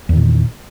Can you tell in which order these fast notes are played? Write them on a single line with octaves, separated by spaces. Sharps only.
E2 D#3 A#2